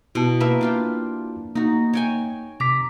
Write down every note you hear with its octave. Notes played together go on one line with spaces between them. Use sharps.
B2 E4 F#4 F#5 A5
A#3 B4 E5
D4 F4 G5
A#3 D#4 F#4
C#5 G5 G#5
C3 A#5 D6 B6